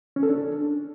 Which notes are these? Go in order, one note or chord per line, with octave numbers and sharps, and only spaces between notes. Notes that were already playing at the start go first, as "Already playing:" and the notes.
C#4
A4
D4